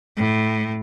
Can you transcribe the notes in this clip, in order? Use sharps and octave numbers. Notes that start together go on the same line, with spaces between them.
A2